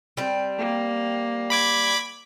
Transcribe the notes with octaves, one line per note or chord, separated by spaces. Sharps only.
G3 C4
A#3
B5 D6 G#6